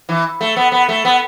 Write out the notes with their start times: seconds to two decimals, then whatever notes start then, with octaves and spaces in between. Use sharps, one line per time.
0.09 E3
0.41 A3
0.57 B3
0.72 B3
0.89 A3
1.05 B3